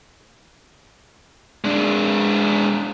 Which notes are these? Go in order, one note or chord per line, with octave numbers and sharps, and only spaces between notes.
G#3 D4